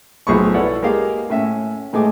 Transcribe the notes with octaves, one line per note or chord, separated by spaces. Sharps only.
B1 A2 F3 G#4 B5 C#6
E4 A4 B4 C#5 D5 F#5
G#3 A#3 G4 F5
A2 C#4 E5
A2 G#3 A3 G#5 D6